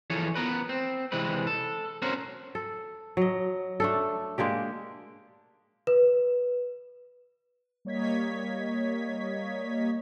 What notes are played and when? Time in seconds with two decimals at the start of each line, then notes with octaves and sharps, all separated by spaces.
0.10 E3 F3 G#4 A4 C#5
0.35 B3 A#4 B4
0.69 C4
1.12 C3 E3 G#3 C4 B4
1.47 A4
2.02 C4 C#4 F#4 A#4 C5
2.55 A4
3.17 F#3 D#5
3.80 A3 D4 A4
4.38 G#3 A#3 D4 G4
5.87 B4
7.85 G3 A#3 C#5 D#5 G#6 B6